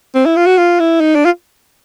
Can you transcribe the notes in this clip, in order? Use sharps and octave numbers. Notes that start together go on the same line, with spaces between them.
C4
E4
F4
F#4
F4
E4
D#4
D4
F4